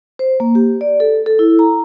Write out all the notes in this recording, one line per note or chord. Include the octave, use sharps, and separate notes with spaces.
C5
A#3
G4
D5
A4
A4
E4
A#5